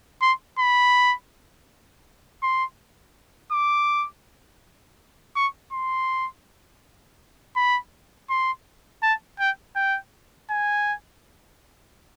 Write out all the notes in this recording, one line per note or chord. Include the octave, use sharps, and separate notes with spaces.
C6
B5
C6
D6
C#6
C6
B5
C6
A5
G5
G5
G#5